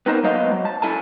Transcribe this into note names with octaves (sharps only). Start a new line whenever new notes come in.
B3 C4 D#4 A#4 C5
F#3 A#3 B3 C5 D#5 F5
F#3
A5
C#4 E4 A4 G#5 A5